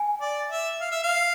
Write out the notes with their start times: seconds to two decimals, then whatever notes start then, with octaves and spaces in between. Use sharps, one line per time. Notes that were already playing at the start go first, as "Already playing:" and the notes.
Already playing: G#5
0.21 D5
0.50 E5
0.80 F5
0.91 E5
1.03 F5